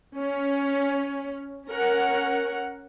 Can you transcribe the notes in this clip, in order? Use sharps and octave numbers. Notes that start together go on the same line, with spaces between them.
C#4
C#4 A#4 F#5